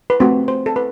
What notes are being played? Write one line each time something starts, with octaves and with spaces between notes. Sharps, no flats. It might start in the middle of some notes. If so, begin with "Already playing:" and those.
B4
A3 C4 F#4 C5
C5
A4
B4